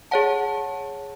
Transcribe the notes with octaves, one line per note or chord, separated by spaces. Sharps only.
G#4 C#5 F#5 A5